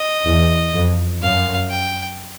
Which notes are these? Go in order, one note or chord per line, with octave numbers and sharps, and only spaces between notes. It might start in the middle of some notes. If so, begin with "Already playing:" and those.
Already playing: D#5
E2
F2
F#2 F5
G5